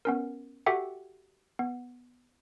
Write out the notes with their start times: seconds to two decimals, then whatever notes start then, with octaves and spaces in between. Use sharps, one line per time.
0.05 B3 C#4 A#4
0.66 F#4 G4 A4 E5 F#5 G5
1.59 B3